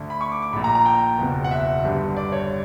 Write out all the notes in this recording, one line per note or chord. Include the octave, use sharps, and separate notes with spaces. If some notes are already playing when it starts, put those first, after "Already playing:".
Already playing: D2 D3
B5
C#6
D6
D6
A#1 A#2 B5
A#5
A#5
G5
F#1 E2 B2
F#5
E5
G1 G2 D3
D5
C#5